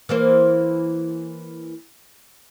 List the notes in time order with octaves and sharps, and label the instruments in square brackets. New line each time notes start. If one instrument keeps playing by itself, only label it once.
[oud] E3 A#3 C5